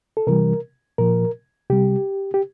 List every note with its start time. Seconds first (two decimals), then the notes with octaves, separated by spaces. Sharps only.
0.17 A4
0.27 C3 E3 G3 A#4
0.98 A#2 F3 A#4
1.70 C3 G3 G4
2.34 G4